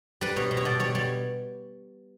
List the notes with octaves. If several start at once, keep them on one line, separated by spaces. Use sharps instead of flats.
G3 B4
B2 C#5
B2
C#5
B2 D5
G3 C#5
G3 C#5